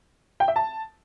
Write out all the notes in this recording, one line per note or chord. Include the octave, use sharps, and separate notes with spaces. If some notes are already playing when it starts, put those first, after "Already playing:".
G5
E5
A5